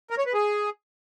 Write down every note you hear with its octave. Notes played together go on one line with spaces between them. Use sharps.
A#4
C#5
B4
G#4